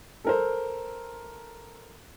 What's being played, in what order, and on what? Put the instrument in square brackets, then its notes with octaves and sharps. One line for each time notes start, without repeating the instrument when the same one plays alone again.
[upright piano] A4 A#4 C5